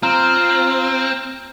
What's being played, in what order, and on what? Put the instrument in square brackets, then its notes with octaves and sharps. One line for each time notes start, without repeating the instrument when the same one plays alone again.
[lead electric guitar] C4 [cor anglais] F4 [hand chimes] A#5 F6